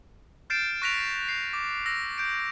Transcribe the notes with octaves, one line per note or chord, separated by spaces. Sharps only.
F6 G6 A6 C7 D7 E7
C#6 F#6 A#6 B6 D7 F7
C7
D6
E6 A#6
G6 D7